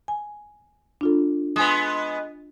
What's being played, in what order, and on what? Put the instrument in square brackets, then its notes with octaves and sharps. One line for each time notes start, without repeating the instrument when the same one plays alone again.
[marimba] G#5
D4 F4 A4
[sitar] G#3 B3 [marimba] G#5 D#6